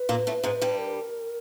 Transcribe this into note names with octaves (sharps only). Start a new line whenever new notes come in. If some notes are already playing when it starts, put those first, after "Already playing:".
Already playing: B4
A#2 A#3
A2 A3
G#2 G#3
G2 G3
A#4